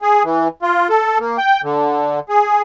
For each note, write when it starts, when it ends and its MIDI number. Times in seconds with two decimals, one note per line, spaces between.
0.02 0.23 68
0.24 0.48 52
0.62 0.88 65
0.89 1.18 69
1.19 1.37 58
1.38 1.61 79
1.63 2.20 50
2.29 2.62 68